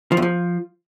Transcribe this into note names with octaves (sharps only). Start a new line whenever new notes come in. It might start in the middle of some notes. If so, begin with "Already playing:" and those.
F3
E2
F3